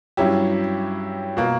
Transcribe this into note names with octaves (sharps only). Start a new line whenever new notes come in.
G2 F#3 C#4 E4 G4
B2 A#3